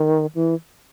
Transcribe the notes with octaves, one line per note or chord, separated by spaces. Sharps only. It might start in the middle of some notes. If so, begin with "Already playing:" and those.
Already playing: D#3
E3